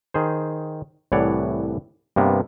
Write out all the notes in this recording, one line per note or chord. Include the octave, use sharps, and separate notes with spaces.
D#3 G#4 C5
C2 A2 E3 C#5 D5 F#5
G2 C3 A#3 B3